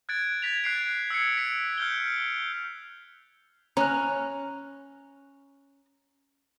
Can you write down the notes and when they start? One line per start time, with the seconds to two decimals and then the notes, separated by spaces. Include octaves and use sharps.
0.09 F#6 G#6 A6 D7
0.42 G#6 A6 B6 F7
0.64 F#6 C7 D7
1.10 E6 G#6 C7 C#7
1.37 B6 D7
1.78 F6 G6 G7
3.77 C#4 A#5 F6 F#6